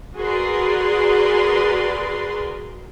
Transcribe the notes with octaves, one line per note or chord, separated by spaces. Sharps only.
F#4 G#4 A#4 B4 D5 C6